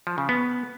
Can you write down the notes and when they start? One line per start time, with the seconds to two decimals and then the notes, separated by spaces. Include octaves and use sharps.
0.07 F3
0.18 C#3
0.29 B3